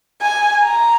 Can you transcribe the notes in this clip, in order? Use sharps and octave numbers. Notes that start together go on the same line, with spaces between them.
G#5
A#5